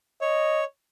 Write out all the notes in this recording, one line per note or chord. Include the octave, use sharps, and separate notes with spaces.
C#5 D#5